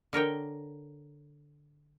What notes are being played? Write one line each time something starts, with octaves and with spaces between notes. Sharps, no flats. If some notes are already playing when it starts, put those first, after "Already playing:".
D3 A#4 C#5 G5